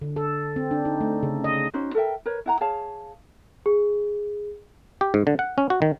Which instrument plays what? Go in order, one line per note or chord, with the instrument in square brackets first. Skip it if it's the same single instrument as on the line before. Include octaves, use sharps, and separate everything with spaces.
[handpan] D3
A4
C4
D4
D#4
A3
C#3
D#5
[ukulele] C#4 D#4 F#4 C5
A4 A#4 E5 G5
A#4 B4 C#5
E4 F#5 A#5
G#4 C#5 F5 A5
[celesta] G#4
[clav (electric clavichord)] G4
G#2
D3
F#5
C#4
F#4
D#3